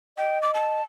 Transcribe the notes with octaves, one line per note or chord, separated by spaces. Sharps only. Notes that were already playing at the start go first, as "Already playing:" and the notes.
D#5 G5
D6
A5